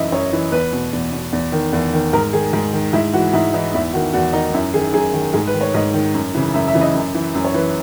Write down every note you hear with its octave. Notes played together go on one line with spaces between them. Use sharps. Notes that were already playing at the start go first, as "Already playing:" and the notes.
Already playing: F#2 E3 D#5 E5
F#2 C#5
E3
E2 B4
B2
E2
B2
E2
D#3
E2
D#3
G#2 A#4
D#3 G#4
G#2
D#3
G#2 E4
E3 F#4
G#2 E4
E3 D#4
E2 E4
D#3 F#4
E2 F#4
D#3 D#4
F#2 E4
D#3 G#4
F#2 G#4
D#3
G#2 G#4
B4
D#3
C#5
G#2 D#5
D#3
F#2
C#3 E3
F#2 E5
E5
C#3 E3
D#5
F#2
E3
F#2
C#5
E3 B4